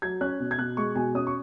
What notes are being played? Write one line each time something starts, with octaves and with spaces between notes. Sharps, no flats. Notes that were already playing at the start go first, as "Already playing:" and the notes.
F#3 G#6
C#4 F#6
B2
G#6
B2 F#6
G#3 C#6
B2 G#5
C#4 D#6
C#6